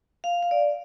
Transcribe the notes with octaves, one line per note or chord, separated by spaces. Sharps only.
F5
F5
D5